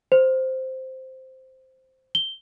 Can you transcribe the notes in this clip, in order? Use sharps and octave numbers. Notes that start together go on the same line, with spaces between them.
C5
G7